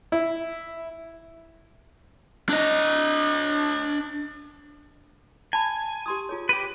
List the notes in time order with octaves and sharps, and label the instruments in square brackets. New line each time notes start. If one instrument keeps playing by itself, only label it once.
[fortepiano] E4
[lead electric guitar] D4 D#5
[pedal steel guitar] G#5 [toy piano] A5 B5
[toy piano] G4 C6 D#6
F4 G#4 C#5
[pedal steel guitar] G4 B4